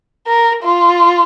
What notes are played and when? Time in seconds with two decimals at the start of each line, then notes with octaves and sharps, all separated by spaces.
0.27 A#4
0.63 F4